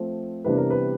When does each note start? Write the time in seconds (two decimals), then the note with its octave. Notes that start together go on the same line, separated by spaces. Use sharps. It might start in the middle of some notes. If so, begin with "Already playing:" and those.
Already playing: F3 A3 C4
0.45 C3 E3 G3 B3 D4 B4
0.58 A#4
0.70 B4